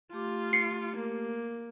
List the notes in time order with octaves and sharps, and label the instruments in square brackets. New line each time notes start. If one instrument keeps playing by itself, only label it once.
[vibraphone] A3 G4 D6 [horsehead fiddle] F4
[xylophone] C7 C#7
[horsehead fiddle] A#3